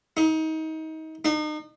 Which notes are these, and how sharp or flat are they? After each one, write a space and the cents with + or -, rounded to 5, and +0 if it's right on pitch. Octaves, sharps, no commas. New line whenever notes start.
D#4 +30
D#4 -35